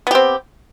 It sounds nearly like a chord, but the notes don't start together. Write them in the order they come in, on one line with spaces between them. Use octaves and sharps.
B3 G4 C4